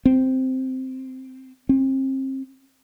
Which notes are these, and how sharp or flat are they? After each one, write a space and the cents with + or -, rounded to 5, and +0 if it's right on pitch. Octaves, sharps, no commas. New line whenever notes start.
C4 -5
C4 +35